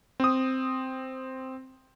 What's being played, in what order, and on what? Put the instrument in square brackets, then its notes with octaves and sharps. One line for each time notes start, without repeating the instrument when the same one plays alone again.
[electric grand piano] C4 D#6